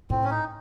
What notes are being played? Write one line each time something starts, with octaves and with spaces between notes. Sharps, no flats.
A2 C4
C#4
D#4